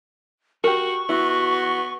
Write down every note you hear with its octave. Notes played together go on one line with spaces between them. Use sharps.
F#4 G4 A#4 C#6
B3 E4 F#4